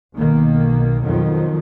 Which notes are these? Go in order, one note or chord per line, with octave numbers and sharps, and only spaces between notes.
B1 B2 D#3 A#3
F2 B2 D#3 F3 F#3